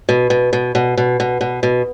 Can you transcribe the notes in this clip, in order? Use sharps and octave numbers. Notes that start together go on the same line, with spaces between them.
B2
B2
B2
B2
B2
B2
B2
B2